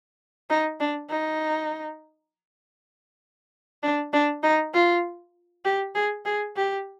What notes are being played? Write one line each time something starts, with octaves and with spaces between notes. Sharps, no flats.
D#4
D4
D#4
D4
D4
D#4
F4
G4
G#4
G#4
G4